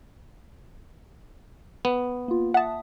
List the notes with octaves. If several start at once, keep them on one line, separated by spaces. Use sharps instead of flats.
B3
A#3 F4
E5 F#5 A5 D#6